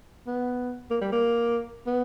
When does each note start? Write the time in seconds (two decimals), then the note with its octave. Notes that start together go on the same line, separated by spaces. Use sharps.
0.27 B3
0.90 A#3
1.01 G3
1.12 A#3
1.86 B3